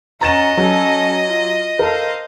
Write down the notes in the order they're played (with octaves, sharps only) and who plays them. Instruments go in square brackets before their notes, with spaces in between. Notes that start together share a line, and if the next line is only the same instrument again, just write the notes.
[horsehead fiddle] C#4 F#4 [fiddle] D#5 [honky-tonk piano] A#5 A6 E7
[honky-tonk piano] F#3 [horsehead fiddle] C#4 A4
[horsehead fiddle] F4
[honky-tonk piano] A4 A#4 [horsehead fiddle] C5 F5